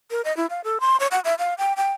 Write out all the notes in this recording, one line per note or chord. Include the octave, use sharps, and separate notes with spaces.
A#4
D#5
E4
F5
A4
C6
C#5
F#5
E5
F5
G5
G5